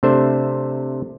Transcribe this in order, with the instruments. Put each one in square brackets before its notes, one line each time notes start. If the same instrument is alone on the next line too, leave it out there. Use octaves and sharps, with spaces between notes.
[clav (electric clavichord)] C3 A3 D4 C5 E5